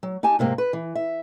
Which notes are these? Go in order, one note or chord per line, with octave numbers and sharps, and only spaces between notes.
F#3
D#4 G4 G#5 A5
G#2 C3 A#3 C4
B4
E3
E5